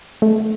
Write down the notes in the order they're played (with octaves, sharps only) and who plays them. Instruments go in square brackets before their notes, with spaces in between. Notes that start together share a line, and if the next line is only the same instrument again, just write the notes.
[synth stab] A3